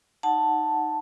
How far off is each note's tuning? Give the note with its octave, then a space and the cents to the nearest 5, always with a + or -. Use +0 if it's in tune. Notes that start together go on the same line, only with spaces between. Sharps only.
D#4 +0 F#5 +0 A5 +0